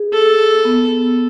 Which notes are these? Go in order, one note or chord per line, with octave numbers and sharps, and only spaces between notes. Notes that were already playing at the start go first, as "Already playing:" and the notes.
Already playing: G#4
A4
B3